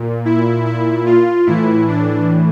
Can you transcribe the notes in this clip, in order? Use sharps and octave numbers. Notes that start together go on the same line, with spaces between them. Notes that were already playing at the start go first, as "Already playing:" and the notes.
Already playing: A#2
E4
E4
F4
A2 E3 E4
D4